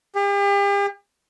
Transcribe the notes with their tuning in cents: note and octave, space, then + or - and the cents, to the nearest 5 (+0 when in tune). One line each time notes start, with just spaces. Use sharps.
G4 +40